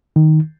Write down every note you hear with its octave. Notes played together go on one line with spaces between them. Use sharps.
D#3